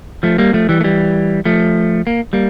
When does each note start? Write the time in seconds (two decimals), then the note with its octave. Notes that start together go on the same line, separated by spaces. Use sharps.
0.23 F3 A3
0.38 G3 A#3
0.53 F3 A3
0.69 E3 G3
0.80 A3
0.84 E3 G3
1.45 F3 A3
2.07 A#3
2.33 G3 A#3